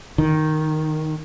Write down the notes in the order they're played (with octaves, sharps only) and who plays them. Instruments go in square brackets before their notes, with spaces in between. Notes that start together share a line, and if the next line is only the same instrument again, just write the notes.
[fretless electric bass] D#3